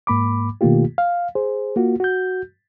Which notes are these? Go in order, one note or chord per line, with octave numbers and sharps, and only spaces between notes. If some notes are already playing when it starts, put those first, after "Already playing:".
G#2 A#3 B5 D6
B2 D#3 A3 A#3 F4 G4
F5
G#4 C5
A#3 F4 F#4
F#4 G6